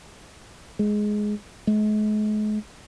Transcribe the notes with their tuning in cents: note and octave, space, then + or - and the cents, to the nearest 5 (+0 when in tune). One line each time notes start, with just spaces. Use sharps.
G#3 +10
G#3 +40